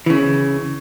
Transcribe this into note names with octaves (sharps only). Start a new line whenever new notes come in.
C#3 E3